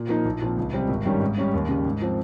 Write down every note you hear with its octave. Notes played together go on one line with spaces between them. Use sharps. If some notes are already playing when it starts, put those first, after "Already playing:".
Already playing: A#2
F3 A#3 D#4
A#1
A#2 F3 C4
C#2
C3 G3 C4
G#1
G2 D#3 G3 C#4
G#2
G3 C#4
D#2
C#3 G3
G#2
F3 C4